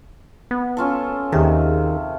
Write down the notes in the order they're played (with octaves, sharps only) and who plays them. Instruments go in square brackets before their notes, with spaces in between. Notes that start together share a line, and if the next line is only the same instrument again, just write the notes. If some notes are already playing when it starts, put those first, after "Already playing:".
[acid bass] B3
[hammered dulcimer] C#4 F4 A4
[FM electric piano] D#2 G#4 [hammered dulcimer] C3 [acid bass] D#3